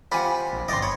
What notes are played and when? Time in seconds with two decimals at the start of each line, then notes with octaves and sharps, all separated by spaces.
0.12 C4 F4 G4 F#5 G#5 B5
0.53 A#1
0.68 G1 C4 E4 D5 D#5 C6
0.82 C#5 B5